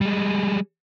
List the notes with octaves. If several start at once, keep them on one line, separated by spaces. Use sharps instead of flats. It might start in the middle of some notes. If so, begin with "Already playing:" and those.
G3 G#3